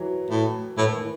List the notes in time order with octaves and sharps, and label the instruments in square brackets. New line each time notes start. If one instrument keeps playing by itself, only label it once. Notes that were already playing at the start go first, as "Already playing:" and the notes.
Already playing: [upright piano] E3 F#3
[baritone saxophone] A2
[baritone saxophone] A2 [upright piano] E3
[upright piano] D#3
E3